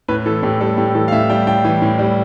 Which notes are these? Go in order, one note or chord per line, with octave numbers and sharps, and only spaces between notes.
A2 B4
E3 A4
A2 G4
G3 A4
A2 G4
E3 A4
F5
A2 E5
G3 G5
A2 G5
E3
A2
G3